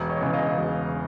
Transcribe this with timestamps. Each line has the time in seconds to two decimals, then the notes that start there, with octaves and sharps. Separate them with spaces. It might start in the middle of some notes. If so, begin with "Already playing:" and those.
Already playing: E1
0.09 C#5 D#5
0.21 E2 C#3
0.33 D#5 F5
0.58 E1